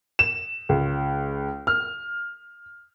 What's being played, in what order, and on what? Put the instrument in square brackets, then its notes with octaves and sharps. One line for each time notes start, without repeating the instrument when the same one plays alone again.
[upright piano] E7
C#2
F6